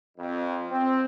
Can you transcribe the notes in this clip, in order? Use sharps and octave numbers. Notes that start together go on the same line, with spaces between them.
F2
C4